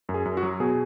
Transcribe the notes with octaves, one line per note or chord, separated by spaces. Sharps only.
F#2
G#4
F#2
F#4
F#3
B2 G#4